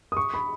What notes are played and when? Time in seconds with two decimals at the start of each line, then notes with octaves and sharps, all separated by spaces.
0.12 D#6
0.17 C#6
0.34 B5